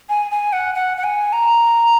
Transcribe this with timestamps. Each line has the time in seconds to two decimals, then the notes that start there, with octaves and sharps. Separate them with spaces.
0.09 G#5
0.31 G#5
0.53 F#5
0.75 F#5
0.97 F#5
1.04 G#5
1.33 A#5